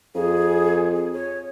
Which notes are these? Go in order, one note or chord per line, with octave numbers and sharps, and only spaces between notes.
F2 G#4
G#4
C#5